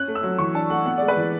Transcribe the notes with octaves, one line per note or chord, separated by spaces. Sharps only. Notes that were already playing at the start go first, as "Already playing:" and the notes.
Already playing: C#4 F#6
A3
E6
F#3
E3 C#6
D4 A5
A3 F#5
B3 F#5
G#3 D5
B4
E3